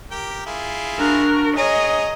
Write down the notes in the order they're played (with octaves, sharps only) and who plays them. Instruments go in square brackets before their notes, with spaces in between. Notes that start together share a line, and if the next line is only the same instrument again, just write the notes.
[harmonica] G4 A#4 G5
E4 F4 G#4
[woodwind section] D4 F#4 [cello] A#4
[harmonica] G#4 A#5 [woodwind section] C#5 [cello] D#5